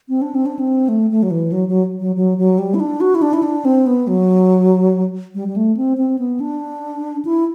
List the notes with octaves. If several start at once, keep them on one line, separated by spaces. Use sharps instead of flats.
C4
D4
C4
D4
C4
A3
A3
F#3
E3
F#3
F#3
F#3
F#3
F#3
G3
E4
D4
F#4
E4
D4
E4
D4
C4
B3
F#3
G3
G3
A3
C4
C4
B3
D4
E4